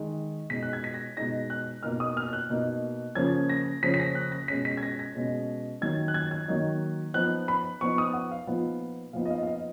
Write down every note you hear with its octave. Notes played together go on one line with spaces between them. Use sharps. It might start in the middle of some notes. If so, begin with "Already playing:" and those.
Already playing: D#3 G#3 D#4
B2 G#3 D#4 B6
F#6
G#6
B6
A#6
B2 G#3 D#4 A#6
F#6
B2 A#3 D#4 F6
D#6
F6
F6
F#6
B2 A#3 D#4
C#3 F3 A#3 C#4 G#6
A#6
C#3 F3 A#3 C#4 B6
B6
A#6
F#6
A#6
B2 G#3 C#4 B6
B6
G#6
A#6
A#6
B2 G#3 C#4
D#3 F#3 A#3 D#4 G#6
F#6
G#6
G#6
D#3 F#3 A#3 D#4
F3 B3 D#4 F#6
B5
F3 B3 D#4 C#6
D#6
F#5
F5
A#2 F3 B3 D#4
A#2 F3 B3 D#4 F5
D#5
F5
F5
D#5